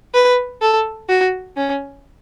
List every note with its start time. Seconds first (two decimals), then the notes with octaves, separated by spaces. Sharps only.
0.14 B4
0.62 A4
1.09 F#4
1.57 C#4